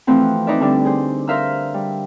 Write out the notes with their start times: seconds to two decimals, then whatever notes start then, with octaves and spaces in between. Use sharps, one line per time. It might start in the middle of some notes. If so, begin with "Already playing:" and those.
0.07 E3 F3 A3 C4 F#4
0.47 D#4 B4 D5 E5
0.60 D3 G3 D4 D#4
0.85 G#4 C5
1.28 A#4 C5 E5 F5 A#5 E6
1.74 G3